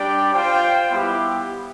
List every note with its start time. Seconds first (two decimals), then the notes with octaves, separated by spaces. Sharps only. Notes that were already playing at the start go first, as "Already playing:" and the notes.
Already playing: G3 D4 G4 D5 G5
0.33 F4 C5 G5
0.91 G3 B3 E4 G4